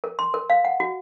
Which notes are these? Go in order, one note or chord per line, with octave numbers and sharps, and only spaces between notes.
A#4
C6
A#4
F5
F#5
F#4